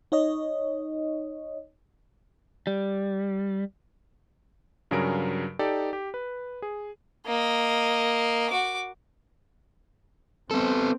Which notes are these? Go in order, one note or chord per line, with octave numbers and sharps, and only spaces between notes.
D#4 C#5 D#5
G3
G2 C#3 F#3 G#4 A#4 D7
D#4 G4 A4 D5
G4
B4
G#4
A#3 D#5
F#4 D6
B3 C4 A4